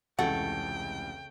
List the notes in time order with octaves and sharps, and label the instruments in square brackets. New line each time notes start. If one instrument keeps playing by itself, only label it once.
[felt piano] F1 C#2 E3 [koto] C#3 A3 A4 [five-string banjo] F#5 [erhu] G5